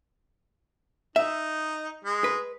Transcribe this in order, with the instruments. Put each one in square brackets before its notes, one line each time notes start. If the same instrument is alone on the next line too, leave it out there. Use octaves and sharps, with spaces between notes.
[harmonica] D#4 [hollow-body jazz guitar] E5
[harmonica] G#3
[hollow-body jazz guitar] B4